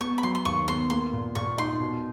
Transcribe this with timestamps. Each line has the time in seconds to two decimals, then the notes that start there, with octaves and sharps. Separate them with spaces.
0.01 B3 C#6
0.18 B5
0.23 F#3 C6
0.35 C6
0.45 D#2 C#6
0.68 B3 C6
0.90 A#3 C6
1.13 A#2
1.35 A#2 C#6
1.58 D#4 C6
1.80 B2